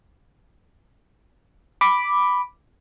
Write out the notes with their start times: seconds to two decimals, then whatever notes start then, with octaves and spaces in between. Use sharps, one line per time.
1.81 B5 D6